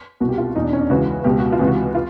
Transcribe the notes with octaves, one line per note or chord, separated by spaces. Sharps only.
C2 B2 F#4
G4
F4
E2 B2 D#4
D4
C#4
D4
C#2 C#3 E3 F#4
C#2 B2 G4
F#4
F4
C#2 C3 E3
F#4
F4